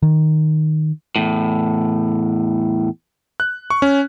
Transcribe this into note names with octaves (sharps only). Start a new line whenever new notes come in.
D#3
E2 A2
F#6
C#6
C#4